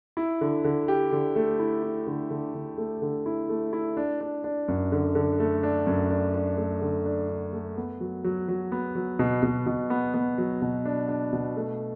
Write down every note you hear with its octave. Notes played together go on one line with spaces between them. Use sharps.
E4
D3
D3
G4
D3
A3
E4
E4
D3
D3
D3
A3
D3
E4
A3
E4
D4
D4
D4
F#2
D3
D3
A3
D4
F#2
D4
D4
A3
D3
D4
D4
A3
B3
F#3
F#3
F#3
B3
F#3
B2
B2
B2
B3
B3
F#3
B2
D4
D4
B2
A3